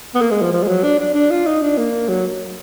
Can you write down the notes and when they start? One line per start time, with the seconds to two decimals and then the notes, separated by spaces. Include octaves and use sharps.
0.15 B3
0.21 A#3
0.31 G#3
0.42 F3
0.52 F3
0.63 G#3
0.68 F#3
0.84 D4
0.99 D4
1.14 D4
1.30 F4
1.46 D#4
1.61 D4
1.77 A#3
2.08 F#3